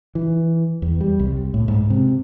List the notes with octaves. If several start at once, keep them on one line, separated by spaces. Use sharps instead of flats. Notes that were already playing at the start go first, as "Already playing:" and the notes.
E3
E2
G3
C2
A2
G#2
C3